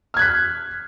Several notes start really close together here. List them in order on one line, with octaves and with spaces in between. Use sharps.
F6 G#6 F#6 B6